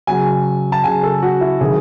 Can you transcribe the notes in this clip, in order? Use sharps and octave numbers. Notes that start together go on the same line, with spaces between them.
C#3 F#3 G#5
A5
C#3 F#3 G#5
A4
F#4
E4
C3 D#3 F#3 G#4